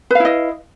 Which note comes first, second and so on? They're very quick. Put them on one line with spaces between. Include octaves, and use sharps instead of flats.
B4 F5 E4 D#5